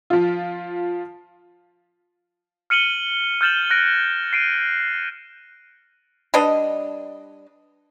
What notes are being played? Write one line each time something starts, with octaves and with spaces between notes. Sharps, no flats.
F3 F4
F6 C#7 D#7 F#7 G7
F6 G6 A6 E7 F#7
F#6 A#6 D7
C7 D7 D#7
G3 D4 B4 D#5